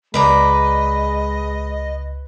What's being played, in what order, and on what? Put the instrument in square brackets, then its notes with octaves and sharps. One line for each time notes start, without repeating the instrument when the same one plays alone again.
[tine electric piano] C#2 [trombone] G#3 [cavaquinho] B4 D5 A#5 [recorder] D#5